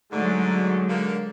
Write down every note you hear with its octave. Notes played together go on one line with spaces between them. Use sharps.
G#2 D3 F#3 G#3 A3
D3 A#3